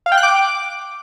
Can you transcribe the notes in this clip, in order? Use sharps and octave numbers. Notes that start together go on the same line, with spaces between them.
F5
G5
F#6
D6